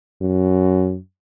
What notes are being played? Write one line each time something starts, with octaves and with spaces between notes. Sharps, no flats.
F#2